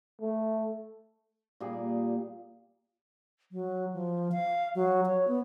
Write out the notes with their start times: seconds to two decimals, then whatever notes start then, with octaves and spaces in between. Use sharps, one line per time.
0.21 A3
1.60 A#2 G3 G#4
3.52 F#3
3.93 F3
4.32 F5
4.75 F#3
5.06 C#5
5.28 B3